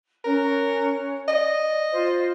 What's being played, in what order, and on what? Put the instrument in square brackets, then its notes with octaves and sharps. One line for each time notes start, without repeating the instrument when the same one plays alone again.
[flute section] C#4 C#5 F#6 [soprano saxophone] A#4
[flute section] D5 [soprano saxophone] D#5
[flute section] F4 C5